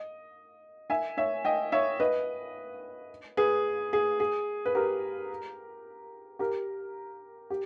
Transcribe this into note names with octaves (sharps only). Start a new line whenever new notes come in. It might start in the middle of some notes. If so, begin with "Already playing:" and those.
Already playing: D#5
E5 G#5
C#5 E5
D#5 G5
C#5 E5
B4 D#5
G#4 B4
G#4
G#4
B4
G4 A#4
G4 A#4
G4